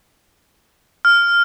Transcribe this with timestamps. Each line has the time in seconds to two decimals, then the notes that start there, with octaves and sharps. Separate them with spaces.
1.05 F6